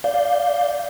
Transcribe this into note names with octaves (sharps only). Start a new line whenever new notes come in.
D5 F5 G6